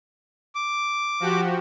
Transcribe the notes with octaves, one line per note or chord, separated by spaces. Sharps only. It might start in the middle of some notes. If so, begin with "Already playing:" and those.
D6
F3 F#4 G4